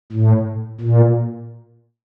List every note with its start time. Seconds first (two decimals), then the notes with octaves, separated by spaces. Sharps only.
0.12 A2
0.81 A#2